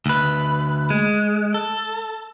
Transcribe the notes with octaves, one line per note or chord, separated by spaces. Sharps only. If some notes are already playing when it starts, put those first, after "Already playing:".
D2 B4
G#3
A4